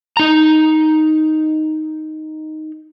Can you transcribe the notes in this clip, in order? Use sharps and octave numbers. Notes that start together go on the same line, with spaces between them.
D#4 A#5